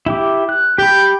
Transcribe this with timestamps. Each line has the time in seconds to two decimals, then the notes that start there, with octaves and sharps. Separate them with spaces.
0.06 E4 G4 D6
0.49 F#6
0.78 G4 G5 B5